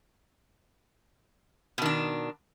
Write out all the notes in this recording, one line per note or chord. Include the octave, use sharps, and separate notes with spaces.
B2 D#3 D4